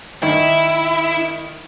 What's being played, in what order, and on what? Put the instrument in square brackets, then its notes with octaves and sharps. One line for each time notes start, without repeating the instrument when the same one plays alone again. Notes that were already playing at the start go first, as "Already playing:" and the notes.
[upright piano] D#3 [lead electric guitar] E4